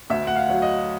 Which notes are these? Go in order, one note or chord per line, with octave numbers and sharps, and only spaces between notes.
D2 E5
F#5
F5
F#3
D#5